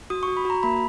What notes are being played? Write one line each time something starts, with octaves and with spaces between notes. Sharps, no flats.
F#4 D#6
C#6
F#4
B5
F#4 A#5
A#3 B5